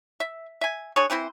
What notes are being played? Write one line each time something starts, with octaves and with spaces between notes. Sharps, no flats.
E5
E5 G#5
D4 G#4 C#5
E3 C4 E4 C5